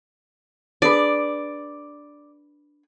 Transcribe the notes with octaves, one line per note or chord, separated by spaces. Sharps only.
D4 G#4 B4 D5